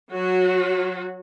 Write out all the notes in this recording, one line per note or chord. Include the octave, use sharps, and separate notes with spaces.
F#3 F#4